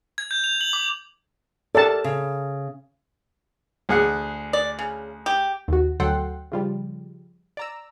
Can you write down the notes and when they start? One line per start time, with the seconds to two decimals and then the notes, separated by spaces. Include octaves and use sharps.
0.18 G#6
0.31 G6
0.44 F7
0.61 F#7
0.73 D6
1.75 G4 A4 A#4 D5 A5
2.04 C#3
3.89 D2 G#4 F#5
4.53 D5
4.79 C#3
5.26 G4
5.68 D#2 F#4
6.00 D2 F#3 A4 F#5 G5 C6
6.52 C#3 F3 G3
7.57 D5 A#5 E6